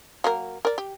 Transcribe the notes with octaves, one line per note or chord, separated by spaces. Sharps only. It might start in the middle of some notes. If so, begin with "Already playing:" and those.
F#3 A#3 A#4
A#4 D5
G4